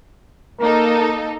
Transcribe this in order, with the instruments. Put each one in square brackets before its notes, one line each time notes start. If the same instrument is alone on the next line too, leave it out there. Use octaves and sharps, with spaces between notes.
[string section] A#3 D#4 A4 [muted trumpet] A#4